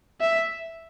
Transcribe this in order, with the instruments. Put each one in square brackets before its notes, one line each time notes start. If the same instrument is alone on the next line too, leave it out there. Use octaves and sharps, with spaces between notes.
[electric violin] E5